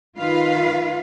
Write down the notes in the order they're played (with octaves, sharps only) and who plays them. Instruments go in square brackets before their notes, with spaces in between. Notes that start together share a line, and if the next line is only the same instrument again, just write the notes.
[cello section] D#3 F4 B4 F5